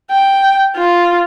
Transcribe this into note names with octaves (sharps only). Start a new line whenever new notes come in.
G5
F4